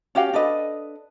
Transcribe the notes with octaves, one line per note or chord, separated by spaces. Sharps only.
C#4 F#4 G4 F5
D4 A4 B4 D#5